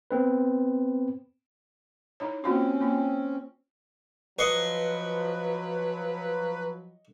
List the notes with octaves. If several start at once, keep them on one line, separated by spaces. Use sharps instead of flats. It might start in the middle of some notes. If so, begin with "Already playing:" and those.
B3 C4 B4
D#4 E4 C#5
A#3 C4 C#4 F4 F#4
A#3 F4
F3 F#3 B4 D#5 C6 C#6